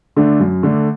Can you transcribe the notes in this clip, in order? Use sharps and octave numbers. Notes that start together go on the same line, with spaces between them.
D3 A3 D4
F#2
D3 A3 D4